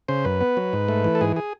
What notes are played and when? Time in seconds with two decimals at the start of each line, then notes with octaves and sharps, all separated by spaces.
0.08 C#3 C5
0.25 F#2 B4
0.41 B3
0.57 F#3
0.73 G#2
0.88 A3
1.04 E3
1.15 A4
1.21 G#2 G#4
1.36 G#4